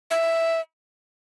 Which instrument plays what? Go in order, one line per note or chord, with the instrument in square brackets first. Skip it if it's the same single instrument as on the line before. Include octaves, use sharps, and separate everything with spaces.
[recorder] E5